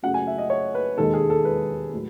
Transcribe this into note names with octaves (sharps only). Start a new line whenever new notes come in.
F#2 C#3 F#3 A3 F#5
G#5
E5
D#5
C#5
B4
E1 D#2 D#3 G#3 A4
G#4
A4
B4
A2 F#3